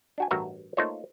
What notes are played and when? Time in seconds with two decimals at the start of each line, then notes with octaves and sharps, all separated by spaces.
0.18 D4 F#4 G#5
0.31 A1 G2 F#4 A#4 E5 A#5
0.77 A3 A#3 D#4 F4 C5 C#5